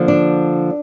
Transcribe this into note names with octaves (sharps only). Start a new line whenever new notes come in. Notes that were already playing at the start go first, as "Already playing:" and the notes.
Already playing: D3 F3 A#3
D4